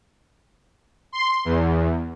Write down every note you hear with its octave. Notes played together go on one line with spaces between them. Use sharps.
C6
E2